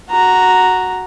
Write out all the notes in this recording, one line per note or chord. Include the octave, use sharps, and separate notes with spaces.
F#4 A#5